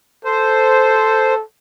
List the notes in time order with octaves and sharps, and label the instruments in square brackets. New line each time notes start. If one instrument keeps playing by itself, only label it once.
[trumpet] A4 [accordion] C5